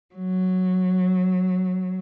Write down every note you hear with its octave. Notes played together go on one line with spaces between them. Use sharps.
F#3